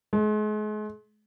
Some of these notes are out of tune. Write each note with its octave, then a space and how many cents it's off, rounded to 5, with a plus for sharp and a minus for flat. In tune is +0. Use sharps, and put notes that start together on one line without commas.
G#3 +40